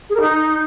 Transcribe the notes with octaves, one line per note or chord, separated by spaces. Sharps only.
G#4
A#4
D#4